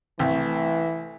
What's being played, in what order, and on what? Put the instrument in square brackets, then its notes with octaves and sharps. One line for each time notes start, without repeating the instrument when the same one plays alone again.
[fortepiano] C2 [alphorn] E3 [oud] A3